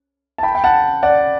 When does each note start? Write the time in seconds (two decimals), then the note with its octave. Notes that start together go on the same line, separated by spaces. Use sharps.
0.38 A5
0.43 G5 B5
0.55 G5
0.64 F#5 A5
1.03 D5 F#5